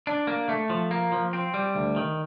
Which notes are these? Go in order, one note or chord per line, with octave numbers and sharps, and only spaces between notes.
D4
A#3
A3
F3
A#3
F3
C4
G3
D2
D#3